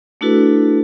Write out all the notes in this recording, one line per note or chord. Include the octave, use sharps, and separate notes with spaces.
A3 D4 E4 F#4 A4 B4